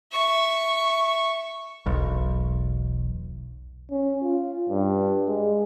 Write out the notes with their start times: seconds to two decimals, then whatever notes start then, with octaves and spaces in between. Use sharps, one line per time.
0.12 E5 C#6
1.86 E1 B1
3.91 C#4
4.23 F4
4.69 G2
5.28 G#3